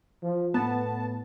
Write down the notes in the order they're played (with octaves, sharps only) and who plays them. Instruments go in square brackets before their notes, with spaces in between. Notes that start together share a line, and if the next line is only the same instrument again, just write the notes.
[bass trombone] F3
[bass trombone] A2 [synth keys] B3 A5